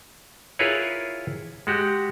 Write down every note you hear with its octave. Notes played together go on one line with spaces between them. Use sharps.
E4 F4 G#4 A#4 B4 C#5
G#3 F#4 G4